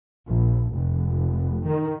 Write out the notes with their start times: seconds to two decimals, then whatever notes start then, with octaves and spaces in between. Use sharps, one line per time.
0.25 A#1
0.73 F1
1.66 D#3